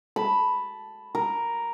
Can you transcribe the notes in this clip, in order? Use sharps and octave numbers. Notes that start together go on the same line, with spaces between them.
A5 B5
A#4